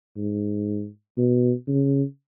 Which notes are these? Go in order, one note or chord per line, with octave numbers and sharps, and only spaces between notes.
G#2
B2
C#3